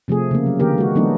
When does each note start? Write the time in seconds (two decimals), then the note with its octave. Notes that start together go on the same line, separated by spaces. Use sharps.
0.08 C3 F3 A3 G#4
0.31 C#3 A#3
0.46 F#3
0.60 D3 E3 A#3 G4 A#4
0.78 G#3 F#4
0.95 E3 F#3 A3 B3 D4 D#4